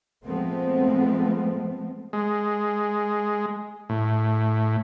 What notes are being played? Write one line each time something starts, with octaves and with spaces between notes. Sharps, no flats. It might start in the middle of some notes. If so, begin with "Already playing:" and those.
F3 G#3 A3 B3 C4
G#3
A2